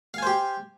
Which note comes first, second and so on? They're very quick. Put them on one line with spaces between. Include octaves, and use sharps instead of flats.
F5 G#5 C5 G4